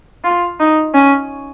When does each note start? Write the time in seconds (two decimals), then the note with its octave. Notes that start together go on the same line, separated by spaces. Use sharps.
0.24 F4
0.60 D#4
0.94 C#4